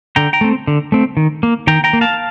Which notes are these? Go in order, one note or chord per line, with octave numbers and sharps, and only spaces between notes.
D3 G5 A#5
G5 A#5
A3 C4
D3
A3 C4
D#3
A#3
D#3 G5 A#5
G5 A#5
A#3
F5 A5